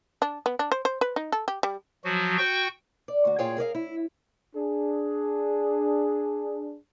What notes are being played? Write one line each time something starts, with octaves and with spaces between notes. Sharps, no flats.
D4
B3
D4
C5
C5
B4
D#4
A4
G4
G3
F3 F#3 F#4
F#4 G5 C#6 G6
D5
D2 F#4
A#2 F4 G#4 C#5 F5 G5
G#4 A#4 D5 F5
E4
D4 G#4